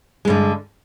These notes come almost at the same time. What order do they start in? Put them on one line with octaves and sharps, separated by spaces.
G#3 G2 D3